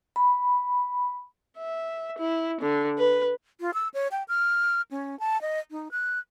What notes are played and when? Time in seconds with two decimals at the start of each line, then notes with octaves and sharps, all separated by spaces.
0.16 B5
1.58 E5
2.18 E4
2.61 D3
2.98 B4
3.61 F4
3.74 E6
3.94 C#5
4.11 G5
4.28 F6
4.91 C#4
5.20 A5
5.42 D#5
5.71 D#4
5.91 F#6